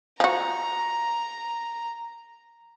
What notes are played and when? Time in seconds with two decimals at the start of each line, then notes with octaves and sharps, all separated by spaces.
0.20 F3 F#4 A#5